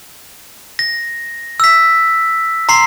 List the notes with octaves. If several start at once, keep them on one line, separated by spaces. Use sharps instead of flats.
A#6
E6 B6
A#5 C6 C7